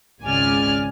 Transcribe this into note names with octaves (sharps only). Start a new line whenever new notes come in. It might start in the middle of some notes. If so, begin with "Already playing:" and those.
G#1 C#2 C#3 D5 G#5 F6